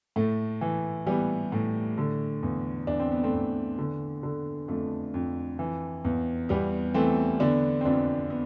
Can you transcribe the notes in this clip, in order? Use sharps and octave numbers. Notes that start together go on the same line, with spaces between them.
A2 A3
E3
E3 G3 B3
A2
D3
E2
E2 D4
C4
B3
A3 C4
E2
D3
D3
F2 A3
F2
E3
E2
E2 G3 B3
E3 A3 C4
D3 B3 D4
C4
F2 B3 D4
B3